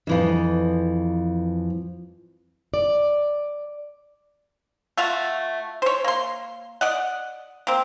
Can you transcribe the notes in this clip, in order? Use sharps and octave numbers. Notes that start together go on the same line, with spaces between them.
F2 E3 F3
D5
A3 F4 F#4 F5
C5 C#5
A#3 C6
D5 D#5 F#5
A#3 C4